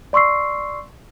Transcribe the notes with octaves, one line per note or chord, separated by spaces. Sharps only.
D5 C6 C#6 E6 C7